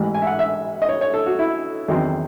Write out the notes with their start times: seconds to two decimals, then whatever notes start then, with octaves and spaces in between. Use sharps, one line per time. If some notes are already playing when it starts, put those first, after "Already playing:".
Already playing: A1 G#2 E3
0.14 G#5
0.22 E5
0.27 F#5
0.39 E5
0.82 D#5
0.89 C#5
1.01 C#5
1.14 A4
1.26 F#4
1.39 E4
1.88 E2 D#3 F#3 C4